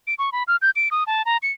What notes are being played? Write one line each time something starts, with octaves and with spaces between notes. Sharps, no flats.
D7
C#6
B5
F6
G6
D7
D#6
A5
A#5
C#7